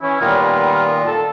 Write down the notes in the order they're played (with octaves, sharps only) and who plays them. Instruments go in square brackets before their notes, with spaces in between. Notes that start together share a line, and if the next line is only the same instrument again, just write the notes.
[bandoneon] E3 [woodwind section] C#4 E4
[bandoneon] A#2 D#3 F4 [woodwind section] G3 B3 A#4
[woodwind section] A4 A5